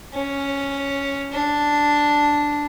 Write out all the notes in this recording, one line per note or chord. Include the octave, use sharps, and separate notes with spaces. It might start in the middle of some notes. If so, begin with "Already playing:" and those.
C#4
D4